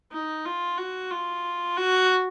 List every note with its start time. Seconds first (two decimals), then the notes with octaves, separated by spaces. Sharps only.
0.12 D#4
0.45 F4
0.78 F#4
1.10 F4
1.77 F#4